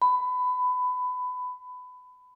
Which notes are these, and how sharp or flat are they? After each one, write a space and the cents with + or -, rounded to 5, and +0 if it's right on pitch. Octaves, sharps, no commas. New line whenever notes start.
B5 +20